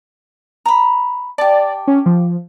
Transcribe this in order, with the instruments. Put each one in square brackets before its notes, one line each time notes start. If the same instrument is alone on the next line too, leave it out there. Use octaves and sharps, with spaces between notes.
[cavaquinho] A#5 B5
[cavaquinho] G4 A5 [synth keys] D5
[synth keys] C#4
F3